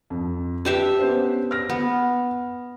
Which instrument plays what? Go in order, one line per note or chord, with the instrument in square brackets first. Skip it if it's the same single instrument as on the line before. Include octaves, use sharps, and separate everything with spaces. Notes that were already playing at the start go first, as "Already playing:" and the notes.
[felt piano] F2
[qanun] D4 G4 E5 [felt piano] B4
[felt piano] B3 C#4 C5
F6 A#6
[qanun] B3